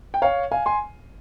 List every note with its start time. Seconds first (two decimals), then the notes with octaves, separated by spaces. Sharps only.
0.14 G5
0.22 C#5 F5
0.52 F5 G#5
0.66 G#5 C6